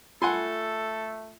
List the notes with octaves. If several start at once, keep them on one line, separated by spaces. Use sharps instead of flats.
A3 F4 A4 F#5 G#5 C6